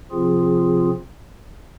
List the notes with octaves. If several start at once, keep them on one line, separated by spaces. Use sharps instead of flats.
C3 F3 C4 F4 G#4